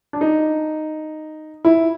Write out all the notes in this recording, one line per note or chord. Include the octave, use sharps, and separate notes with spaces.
D4
D#4
E4